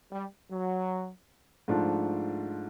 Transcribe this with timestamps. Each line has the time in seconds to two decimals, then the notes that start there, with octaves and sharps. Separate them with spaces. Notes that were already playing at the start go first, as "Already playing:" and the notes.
0.12 G3
0.51 F#3
1.68 G#2 F3 A3 D4 F4